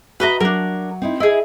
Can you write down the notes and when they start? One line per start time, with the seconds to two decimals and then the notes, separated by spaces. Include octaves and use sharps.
0.20 F#4 B4 D#5 E5 A#5
0.40 F#3 D4 A#4
1.02 C4 D#4 E4
1.20 E4 G#4 D#5